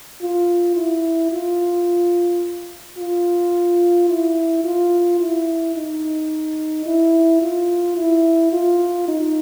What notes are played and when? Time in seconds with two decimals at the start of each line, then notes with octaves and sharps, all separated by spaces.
0.22 F4
0.76 E4
1.32 F4
2.98 F4
4.09 E4
4.64 F4
5.20 E4
5.75 D#4
6.86 E4
7.42 F4
7.97 E4
8.53 F4
9.08 D#4